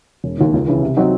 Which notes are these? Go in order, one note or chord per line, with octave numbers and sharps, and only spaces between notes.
E1
D#2 D#3
C#2
C#3 E3
C3
F#3 C4 D#4 F#4